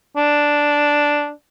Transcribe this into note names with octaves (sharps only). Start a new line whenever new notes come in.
D4